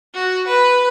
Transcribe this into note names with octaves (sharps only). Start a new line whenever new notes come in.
F#4
B4